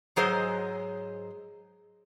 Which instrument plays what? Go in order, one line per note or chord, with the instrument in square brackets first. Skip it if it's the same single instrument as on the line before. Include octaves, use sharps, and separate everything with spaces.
[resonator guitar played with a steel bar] G#2 F#3 G#4 C5 D#5